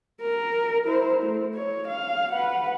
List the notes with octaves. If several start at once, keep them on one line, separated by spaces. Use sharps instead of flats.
A#4
E4 C5
A3
C#5
F5
B4 F#5